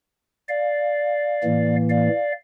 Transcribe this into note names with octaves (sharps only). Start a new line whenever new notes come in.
D5 F5
A2 E3 A#3
D5 F5